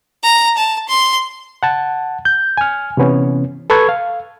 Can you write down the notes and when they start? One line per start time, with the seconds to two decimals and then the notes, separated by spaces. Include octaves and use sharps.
0.23 A#5
0.57 A5
0.89 C6
1.63 F#5 A5
2.25 G6
2.57 G#5 F6
2.97 C3 E3 B3 C#4
3.70 A4 B4 C#6 G#6
3.89 F5